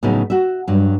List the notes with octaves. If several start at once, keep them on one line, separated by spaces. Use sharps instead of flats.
A2 C#3 F#3 B3 D#4
F#4 E5
G2 F#3